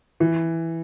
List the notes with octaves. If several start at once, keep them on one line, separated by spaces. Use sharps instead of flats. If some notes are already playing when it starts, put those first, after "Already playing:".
E3